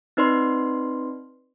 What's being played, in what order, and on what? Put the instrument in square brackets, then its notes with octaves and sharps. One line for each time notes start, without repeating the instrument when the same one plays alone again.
[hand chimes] C4 D#4 B4 D5 C6